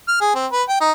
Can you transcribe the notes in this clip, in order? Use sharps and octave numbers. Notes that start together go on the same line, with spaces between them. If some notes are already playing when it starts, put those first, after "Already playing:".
F6
G#4
C4
B4
G5
D#4